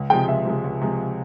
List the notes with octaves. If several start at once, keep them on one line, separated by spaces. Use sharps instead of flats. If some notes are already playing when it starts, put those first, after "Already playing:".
Already playing: C#2
C3 F3 G#3 G5
C#2 E5
C3 F3 G#3
C#2
C3 F3 G#3